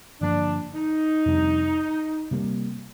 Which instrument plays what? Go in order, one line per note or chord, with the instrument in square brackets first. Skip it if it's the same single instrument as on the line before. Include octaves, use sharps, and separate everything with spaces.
[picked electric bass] G2 D3 F3 A#3 [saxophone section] D4
[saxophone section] D#4
[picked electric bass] F2 C3 G3 D4
C3 G3 A#3